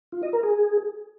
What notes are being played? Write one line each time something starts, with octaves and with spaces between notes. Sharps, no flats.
F4
D#5
A#4
G#4